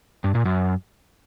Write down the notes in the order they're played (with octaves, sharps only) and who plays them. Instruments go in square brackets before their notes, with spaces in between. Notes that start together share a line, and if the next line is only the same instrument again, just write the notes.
[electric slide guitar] G2
A#2
F#2